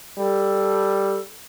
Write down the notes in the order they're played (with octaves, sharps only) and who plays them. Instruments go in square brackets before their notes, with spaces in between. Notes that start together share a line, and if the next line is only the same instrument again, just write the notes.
[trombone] G3 [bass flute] A4